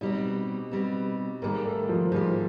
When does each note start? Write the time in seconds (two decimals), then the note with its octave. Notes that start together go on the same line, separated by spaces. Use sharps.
0.01 B2 G3 C4 D#4
0.71 B2 G3 C4
1.42 G#2 D#3 G3 A#3
1.65 A3
1.89 F3
2.12 G#2 D#3 F3 G3